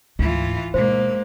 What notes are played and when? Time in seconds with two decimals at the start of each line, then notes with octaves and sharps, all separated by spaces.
0.19 D2 G#2 E3 F4
0.74 G#2 B2 A#3 C5